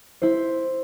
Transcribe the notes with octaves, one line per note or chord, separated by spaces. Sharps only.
E4 C5